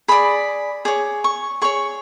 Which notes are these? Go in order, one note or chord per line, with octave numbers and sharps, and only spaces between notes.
G#4 D5 B5
G#4 C#5 D6
C#6
G#4 C#5 C#6